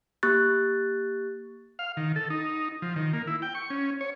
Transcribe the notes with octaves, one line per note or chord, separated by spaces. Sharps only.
A#3 G4 C#6 F#6 A6
F5
D#3
A4
D#4
F3
D#3
A#3
E4
G5
C#6
C#4
C#5